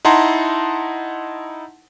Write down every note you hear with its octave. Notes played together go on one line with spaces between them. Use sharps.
D#4 E4 F#5 A5 A#5 C6